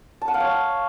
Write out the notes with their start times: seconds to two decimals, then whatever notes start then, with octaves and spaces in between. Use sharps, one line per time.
0.21 A5
0.28 F#5
0.34 F5
0.40 C#5